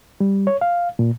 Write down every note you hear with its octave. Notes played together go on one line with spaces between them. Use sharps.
G3
C#5
F5
A#2